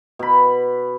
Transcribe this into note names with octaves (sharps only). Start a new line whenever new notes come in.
B2 B5